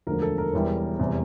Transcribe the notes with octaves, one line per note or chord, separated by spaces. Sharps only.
E1 D2 D3 F3 A#4
A4
A#4
E1 E2 E3 G3
F1 E2 C3 G3